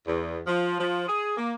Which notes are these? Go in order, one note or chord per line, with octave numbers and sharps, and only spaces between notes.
E2
F3
F3
G#4
A#3